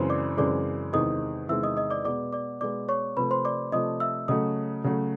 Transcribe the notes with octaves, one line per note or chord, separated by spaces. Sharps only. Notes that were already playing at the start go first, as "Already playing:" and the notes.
Already playing: F#2 C#3 E3 G#3 C4 C5 C6
D5 D6
F#2 C#3 E3 G#3 C4 D5 D6
E2 C3 D#3 G#3 D#5 D#6
E2 C3 D#3 G#3 E5 E6
D#5 D#6
D#5 D#6
D5 D6
B2 G#3 B3 D5 D6
D5 D6
B2 G#3 B3 D5 D6
C#5 C#6
C3 F3 A3 B4 B5
C5 C6
D5 D6
C3 F3 A3 D#5 D#6
E5 E6
C#3 F#3 A3 D#5 D#6
C#3 F#3 A3